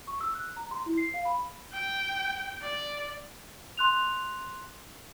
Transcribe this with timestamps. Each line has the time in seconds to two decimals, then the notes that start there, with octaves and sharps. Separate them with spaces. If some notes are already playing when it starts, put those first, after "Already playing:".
0.07 C#6
0.21 E6
0.35 F#6
0.57 A#5
0.71 C6
0.86 E4
0.97 C7
1.14 F5
1.25 B5
1.73 G5
2.62 D5
3.77 C6 F#6 F7